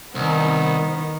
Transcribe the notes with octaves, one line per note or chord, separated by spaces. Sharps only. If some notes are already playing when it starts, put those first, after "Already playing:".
C2 D#3 B3